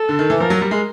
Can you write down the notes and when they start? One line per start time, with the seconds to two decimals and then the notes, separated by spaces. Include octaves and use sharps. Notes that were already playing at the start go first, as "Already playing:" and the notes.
Already playing: A4
0.09 D3
0.19 D#3
0.30 E3
0.40 F3 A#4
0.50 F#3
0.61 G3
0.71 G#3